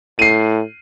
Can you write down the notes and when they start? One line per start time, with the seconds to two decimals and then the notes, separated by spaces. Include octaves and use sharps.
0.19 A2 C7 D#7